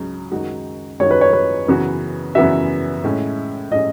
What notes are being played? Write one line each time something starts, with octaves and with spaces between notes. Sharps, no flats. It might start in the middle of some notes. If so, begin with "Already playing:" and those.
Already playing: C#2 C#3 F#3
F#2 D#3 G#3 D#4 F#4
F#2 D#3 G#3 D#4 F#4 C#5
B4
C#5
B4
F#2 C#3 E3 B3 F#4 B4
F#2 C#3 E3 B3 F#4 E5
A2 G#3 C#4
A2 G#3 C#4 D#5